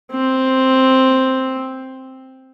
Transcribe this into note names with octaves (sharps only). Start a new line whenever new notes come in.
C4